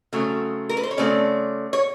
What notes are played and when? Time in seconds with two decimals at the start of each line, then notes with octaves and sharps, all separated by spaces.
0.13 C#3 F#3 A3 C4
0.69 A#4
0.77 B4
0.83 C5
0.91 C#5
0.97 C#3 F#3 A3 C4 D5
1.73 C#5